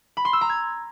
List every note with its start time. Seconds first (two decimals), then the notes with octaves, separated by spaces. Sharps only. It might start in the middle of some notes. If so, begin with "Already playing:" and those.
0.17 B5
0.25 C6
0.33 E6
0.41 A#5
0.49 G#6